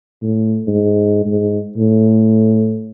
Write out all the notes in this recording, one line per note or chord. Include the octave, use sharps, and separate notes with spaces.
A2
G#2
G#2
A2